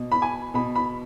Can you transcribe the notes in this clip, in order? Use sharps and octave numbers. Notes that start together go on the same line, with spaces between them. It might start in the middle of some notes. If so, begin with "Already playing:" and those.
Already playing: B2
B5
G#5
B2 B5
B5